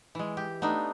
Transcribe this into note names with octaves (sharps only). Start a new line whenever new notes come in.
E3 G#3
G4
A3 B3 D4 D#4